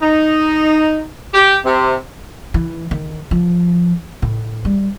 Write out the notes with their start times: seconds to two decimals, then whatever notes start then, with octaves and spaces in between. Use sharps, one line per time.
0.01 D#4
1.34 G4
1.65 C3
2.54 E3
2.91 D#3
3.31 F3
4.22 A2
4.65 G3